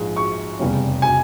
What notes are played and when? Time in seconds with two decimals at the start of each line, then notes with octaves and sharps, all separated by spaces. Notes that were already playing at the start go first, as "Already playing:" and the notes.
Already playing: A#1 G#2 F3
0.16 C#6
0.59 F1 E2 C#3 G3 C#4
1.02 G#5